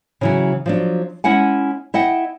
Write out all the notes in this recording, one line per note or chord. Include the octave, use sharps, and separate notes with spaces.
C#3 E3 F#3
F3 F#3 D4
G#3 C#4 E4 F#5 G#5
E4 D#5 F#5 G5